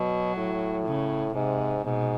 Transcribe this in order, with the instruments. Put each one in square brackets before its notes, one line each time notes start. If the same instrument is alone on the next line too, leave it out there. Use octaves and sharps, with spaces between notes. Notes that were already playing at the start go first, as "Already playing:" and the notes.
Already playing: [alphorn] B2 [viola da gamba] F#3
[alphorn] A2
[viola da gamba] C#3
[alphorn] G#2 [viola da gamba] C3
[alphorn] G#2 [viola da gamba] B2